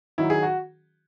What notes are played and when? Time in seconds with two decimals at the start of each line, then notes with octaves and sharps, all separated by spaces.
0.18 D#3 F#3 E4
0.30 G#4
0.43 F#4